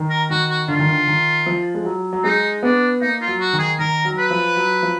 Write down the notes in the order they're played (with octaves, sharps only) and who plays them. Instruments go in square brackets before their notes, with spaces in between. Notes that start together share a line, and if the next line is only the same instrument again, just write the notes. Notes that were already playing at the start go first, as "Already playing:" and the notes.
Already playing: [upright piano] D#3
[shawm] A#4
[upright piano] D#3 [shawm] F#4
[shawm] F#4
[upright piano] D3 [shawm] F4
[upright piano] D#3
D3
D#3
F3
G#3
F#3
F#3
[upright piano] G#3 [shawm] D#4
[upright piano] B3 [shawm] D4
[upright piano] A#3 [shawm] D#4
[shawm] F4
[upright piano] F#3
[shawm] F#4
[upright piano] D#3
[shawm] G#4
[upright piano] D#3 [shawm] A#4
[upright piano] F#3
[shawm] B4
[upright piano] F3
F#3
F3